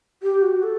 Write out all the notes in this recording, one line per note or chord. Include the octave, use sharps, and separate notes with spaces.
G4
F#4
A4